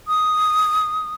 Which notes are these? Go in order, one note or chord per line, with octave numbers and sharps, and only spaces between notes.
D#6